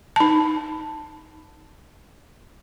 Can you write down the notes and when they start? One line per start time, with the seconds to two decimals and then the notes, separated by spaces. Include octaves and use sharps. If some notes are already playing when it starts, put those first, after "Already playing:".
0.16 D#4 A5